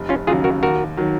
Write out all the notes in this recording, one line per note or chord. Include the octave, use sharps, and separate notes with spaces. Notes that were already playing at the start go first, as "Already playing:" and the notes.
Already playing: F1
C#4 F4
D#2 C#3 F#3 F4 G#4
F#4 A#4
D#2 F#4 A#4
D#3 F#3